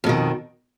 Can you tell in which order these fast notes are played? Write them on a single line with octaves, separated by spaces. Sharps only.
F2 B2 D#3